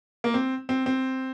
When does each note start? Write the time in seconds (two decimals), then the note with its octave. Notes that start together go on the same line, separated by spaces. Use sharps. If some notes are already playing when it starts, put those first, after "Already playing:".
0.24 A#3
0.34 C4
0.69 C4
0.86 C4